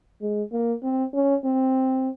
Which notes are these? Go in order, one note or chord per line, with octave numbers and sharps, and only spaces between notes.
G#3
A#3
C4
C#4
C4